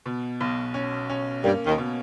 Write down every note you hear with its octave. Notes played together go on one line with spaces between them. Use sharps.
B2
B1
C#4
C#4
G2 G3 A#3
D#2 D#3
B2